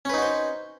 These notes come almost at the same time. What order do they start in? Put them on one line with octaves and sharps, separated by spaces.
C#4 B4 D#4 F#4 C5